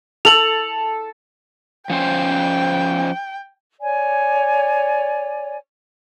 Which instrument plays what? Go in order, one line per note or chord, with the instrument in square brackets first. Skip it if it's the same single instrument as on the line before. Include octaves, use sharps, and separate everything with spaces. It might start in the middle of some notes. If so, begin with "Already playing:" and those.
[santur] A4 [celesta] F7 F#7
[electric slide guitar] F3 C#4 C5 [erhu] G5
[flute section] C#5 D5 G#5